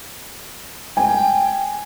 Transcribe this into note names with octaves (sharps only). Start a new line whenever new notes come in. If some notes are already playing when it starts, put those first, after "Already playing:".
G5 G#5